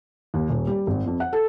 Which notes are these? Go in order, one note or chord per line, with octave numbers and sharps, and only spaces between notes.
D#2
D#1
G3
G#1
F2
F#5
A4